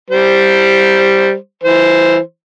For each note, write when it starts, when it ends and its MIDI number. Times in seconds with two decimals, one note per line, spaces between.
0.10 1.35 55
0.10 1.35 72
1.64 2.19 52
1.64 2.19 72